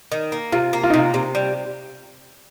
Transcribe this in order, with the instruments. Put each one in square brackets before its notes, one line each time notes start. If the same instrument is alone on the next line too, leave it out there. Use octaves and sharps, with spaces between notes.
[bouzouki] D#3
A#3
[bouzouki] C3 [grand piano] F4
[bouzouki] A#3
[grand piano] F4
D#4
[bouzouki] C3 [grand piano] F4
[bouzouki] C3
G3